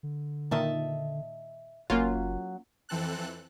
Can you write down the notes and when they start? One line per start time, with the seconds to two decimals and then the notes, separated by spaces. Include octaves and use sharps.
0.03 D3
0.51 A#2 D#3 D#5 E5 A5
1.90 F#1 F#3 A#3 C#4 F4
2.89 F2 E3 C4 A4 F#6